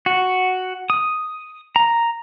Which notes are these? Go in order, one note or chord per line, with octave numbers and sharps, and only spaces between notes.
F#4
D#6
A#5